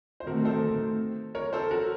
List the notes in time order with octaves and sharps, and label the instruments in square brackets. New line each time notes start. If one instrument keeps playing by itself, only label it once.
[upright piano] C5
[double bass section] D#3 A3 C4 [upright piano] F#4 A#4
[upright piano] A4 C5
A#4 C#5
A4 C5
F#4 A#4